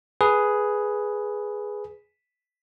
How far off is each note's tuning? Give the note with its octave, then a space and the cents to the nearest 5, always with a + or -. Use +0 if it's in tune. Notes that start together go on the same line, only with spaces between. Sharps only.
G#4 +5 B4 +0